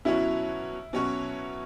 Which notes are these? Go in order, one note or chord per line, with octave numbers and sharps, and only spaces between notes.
B2 F#3 C#4 E4 F#4 C#5
B2 F#3 C#4 F#4 C#5